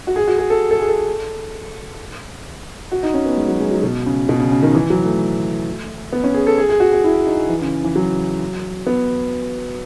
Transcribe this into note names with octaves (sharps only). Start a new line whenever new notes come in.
F#4
G#4
F#4
G#4
A4
A4
G#4
A4
F#4
D#4
C#4
B3
G#3
F#3
G#3
F#3
B2
C#3
B2
C#3
C#3
D#3
E3
F#3
A3
B3
C#4
G#4
A4
G#4
G#4
F#4
G#4
E4
D#4
E3
C#3
E3
F#3
B3